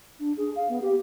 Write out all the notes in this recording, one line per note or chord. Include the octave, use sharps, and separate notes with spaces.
D4
G#4
F5
B3
G4